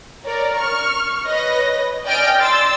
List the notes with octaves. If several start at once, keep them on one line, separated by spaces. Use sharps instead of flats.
A#4 C#5 D5
C#6 F6
B4 C#5 D#5 A#6
D5 D#5 G5 G#5 F6 D7
D5 C6 E6 A6